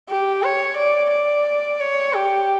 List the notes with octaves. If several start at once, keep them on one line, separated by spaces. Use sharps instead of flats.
G4
C#5
D5
D5
C#5
G4